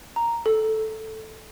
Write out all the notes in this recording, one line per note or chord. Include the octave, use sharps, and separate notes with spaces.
A#5
A4